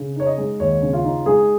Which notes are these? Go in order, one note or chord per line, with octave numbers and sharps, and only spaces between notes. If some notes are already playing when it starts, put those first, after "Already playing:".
Already playing: C#3
D#4 C#5
D#5
G#3
D#2 C#5
C#3
F4
D#4
G#3 G#4